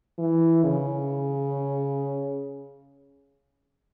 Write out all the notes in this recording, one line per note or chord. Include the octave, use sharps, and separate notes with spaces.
E3
C#3